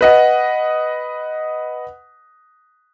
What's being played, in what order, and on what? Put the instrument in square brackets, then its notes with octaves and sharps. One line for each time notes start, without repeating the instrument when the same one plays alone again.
[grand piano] B4 D#5 F#5